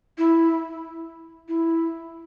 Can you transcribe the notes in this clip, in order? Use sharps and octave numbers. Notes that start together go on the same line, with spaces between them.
E4
E4